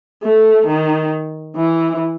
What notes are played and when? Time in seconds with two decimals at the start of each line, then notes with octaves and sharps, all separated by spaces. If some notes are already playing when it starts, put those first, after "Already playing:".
0.23 A3
0.67 D#3
1.56 E3